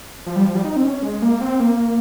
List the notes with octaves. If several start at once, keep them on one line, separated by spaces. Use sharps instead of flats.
F3
G3
F3
G3
D#4
C4
C#4
G#3
A#3
C4
A#3